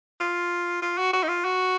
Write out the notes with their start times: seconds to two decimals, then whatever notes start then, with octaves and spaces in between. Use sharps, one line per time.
0.21 F4
0.82 F4
0.98 F#4
1.13 F#4
1.23 D#4
1.28 F4
1.45 F#4